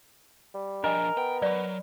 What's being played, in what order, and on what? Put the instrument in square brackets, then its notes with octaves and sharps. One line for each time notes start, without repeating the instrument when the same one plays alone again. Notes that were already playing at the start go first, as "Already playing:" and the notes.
[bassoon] G3
[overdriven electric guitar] F3 D4 [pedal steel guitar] A#4 [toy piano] D#5 G#5
[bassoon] B3 [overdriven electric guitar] G5
[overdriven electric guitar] F#3 [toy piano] D5 B5